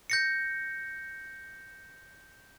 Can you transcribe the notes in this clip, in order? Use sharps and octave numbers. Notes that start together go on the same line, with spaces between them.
G6 A#6 C#7